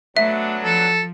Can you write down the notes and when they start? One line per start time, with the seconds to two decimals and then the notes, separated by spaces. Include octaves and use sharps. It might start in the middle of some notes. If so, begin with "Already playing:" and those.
0.17 F#3 A3 B3 D4 E5
0.64 F3 A4